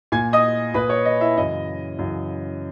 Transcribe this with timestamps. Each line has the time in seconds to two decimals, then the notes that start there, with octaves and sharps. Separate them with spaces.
0.12 A#2 G#5 G#6
0.33 D#5 D#6
0.74 A#2 B4 B5
0.89 C#5
1.05 D#5
1.21 E4 E5
1.37 F#2 C#3 E3 D#5
1.99 F#2 C#3 E3